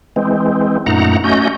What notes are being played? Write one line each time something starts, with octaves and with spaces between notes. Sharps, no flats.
E3 G#3 C4
F#2 A#2 A3 D#4 F#5 A#5
A3 C#4 F#4 D#5 G6